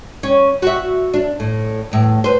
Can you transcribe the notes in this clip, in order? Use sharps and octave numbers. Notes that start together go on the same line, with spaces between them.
C#4
F#4 E5
D4
A2
E2 A2
B4 C5